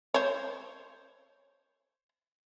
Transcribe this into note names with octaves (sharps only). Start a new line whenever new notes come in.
C5 C#5